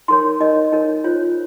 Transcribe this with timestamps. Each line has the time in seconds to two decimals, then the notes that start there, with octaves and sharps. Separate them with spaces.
0.08 D#4 A#4 C#5 C6
0.40 D#4 A#4 C#5 D#5
0.72 D#4 A#4 C#5
1.04 F4 C5 C#5